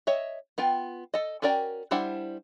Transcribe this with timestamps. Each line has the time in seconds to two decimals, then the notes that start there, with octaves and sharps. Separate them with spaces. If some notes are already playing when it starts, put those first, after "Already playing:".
0.07 C#5 D#5 E5
0.58 B3 F4 G5
1.14 A4 D#5
1.42 C#4 F#4 A#4 D5 G5
1.91 G3 D4 E4 C5 F#5